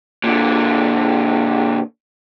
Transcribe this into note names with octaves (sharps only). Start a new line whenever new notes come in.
A#2 D3